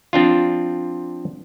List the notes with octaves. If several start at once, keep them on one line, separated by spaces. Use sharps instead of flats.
F3 C4 D4 F4